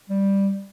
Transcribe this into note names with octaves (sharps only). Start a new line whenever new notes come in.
G3